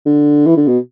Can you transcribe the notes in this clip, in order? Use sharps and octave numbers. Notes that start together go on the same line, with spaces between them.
D3
E3
D3
B2